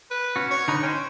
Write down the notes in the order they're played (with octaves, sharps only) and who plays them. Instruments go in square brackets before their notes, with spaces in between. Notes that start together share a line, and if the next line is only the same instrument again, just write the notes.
[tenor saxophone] B4
[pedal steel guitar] C#4 F#4
[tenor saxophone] C#5
[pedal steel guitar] D3 D#4 B4
[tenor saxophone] C#4 [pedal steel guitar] C5 G5